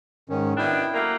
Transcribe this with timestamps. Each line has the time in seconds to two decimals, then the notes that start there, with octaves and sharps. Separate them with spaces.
0.29 G#2 D#3 C#4
0.57 B2 D#3 D4 E4 G5
0.94 F#3 A3 A#3